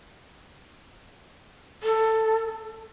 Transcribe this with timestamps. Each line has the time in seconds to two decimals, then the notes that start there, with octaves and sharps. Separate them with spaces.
1.83 A4